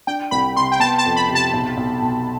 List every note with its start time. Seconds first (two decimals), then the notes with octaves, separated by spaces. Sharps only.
0.07 D4 G5
0.31 C2 B5
0.56 C3 C6
0.72 G5
0.80 B3 A5
0.98 A5
1.05 F2
1.16 B5
1.29 C3
1.35 A5
1.53 B1
1.77 B1
2.02 B2